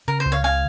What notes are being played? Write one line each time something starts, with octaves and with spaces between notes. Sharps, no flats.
C#3 A#4
C5
C#2
C#5 F5
C#3 F5 G#5